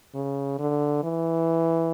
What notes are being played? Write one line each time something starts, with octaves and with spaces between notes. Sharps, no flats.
C#3
D3
E3